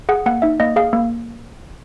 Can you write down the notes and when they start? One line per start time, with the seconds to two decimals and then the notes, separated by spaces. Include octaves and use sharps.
0.09 G#4 F#5
0.26 A#3 F#5
0.42 D#4 E5
0.60 A#3 D#5
0.76 G#4 F5
0.93 A#3